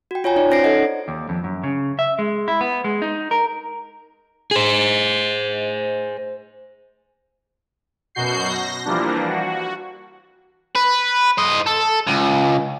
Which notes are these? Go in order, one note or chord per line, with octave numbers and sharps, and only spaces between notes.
F#4 G5
F4 C#5 G5 G#5 A#5
D#4 C#5 D5
C#4 C5 A#6 C7 D7
D#4 A4 D#5 F#5
D#2
F2
F#2
C#3
E5
G#3
E4
B3
G#3
D#4
A#4
G#4 C5
F#2 B2 F#4 G6 C7
A#6
E3 F3 G3 A#3 D4
F#4
B4
C5 D#5
A4
C#2